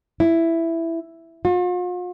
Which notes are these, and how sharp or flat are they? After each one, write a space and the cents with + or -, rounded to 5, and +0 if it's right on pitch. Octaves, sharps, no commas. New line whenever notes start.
E4 +5
F4 +45